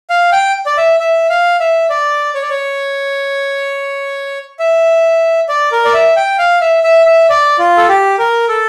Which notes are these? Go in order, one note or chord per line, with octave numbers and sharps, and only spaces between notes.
F5
G5
D5
E5
E5
F5
E5
D5
C#5
D5
C#5
E5
D5
A#4
D5
E5
G5
F5
E5
E5
E5
D5
F4
A4
G4
A#4
A4